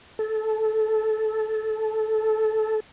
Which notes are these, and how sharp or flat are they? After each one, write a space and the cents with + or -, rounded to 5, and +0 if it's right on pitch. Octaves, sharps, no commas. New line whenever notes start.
A4 -15